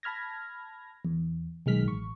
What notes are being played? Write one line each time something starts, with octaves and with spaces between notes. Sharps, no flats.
A5 B5 F6 G#6 A#6
E2
B1 D#3 G#3 F6 B6
A1 C#6